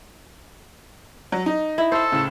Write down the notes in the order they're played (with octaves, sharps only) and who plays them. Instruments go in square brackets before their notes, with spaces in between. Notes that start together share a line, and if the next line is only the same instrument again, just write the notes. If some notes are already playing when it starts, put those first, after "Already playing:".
[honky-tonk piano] F#3
D#4
[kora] E4
[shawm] A4 [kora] C5 F5
[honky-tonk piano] A2 C#3